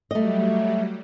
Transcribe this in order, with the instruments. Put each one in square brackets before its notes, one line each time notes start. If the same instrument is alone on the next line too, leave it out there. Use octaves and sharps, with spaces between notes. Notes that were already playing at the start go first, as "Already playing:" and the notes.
[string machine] F#3 G3 [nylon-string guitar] A3 D#5